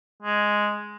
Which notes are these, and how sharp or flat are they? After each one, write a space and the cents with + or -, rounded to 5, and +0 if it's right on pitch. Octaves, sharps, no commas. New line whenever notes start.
G#3 +0